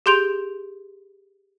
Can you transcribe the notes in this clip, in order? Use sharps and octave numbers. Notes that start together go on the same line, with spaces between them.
G4 G#4 C6 G6 D7 F7